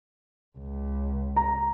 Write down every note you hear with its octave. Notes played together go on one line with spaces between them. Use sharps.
C#2
A#5